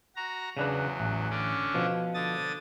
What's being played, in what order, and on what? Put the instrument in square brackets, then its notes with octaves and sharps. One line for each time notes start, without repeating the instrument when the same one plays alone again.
[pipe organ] F#4 A#5
[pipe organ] E2 F#3 [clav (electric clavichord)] C#3 D4 B4
[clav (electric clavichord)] A1
[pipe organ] D3 C#4 D4
[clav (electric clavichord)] B2 F3
[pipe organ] D3 D#6 A6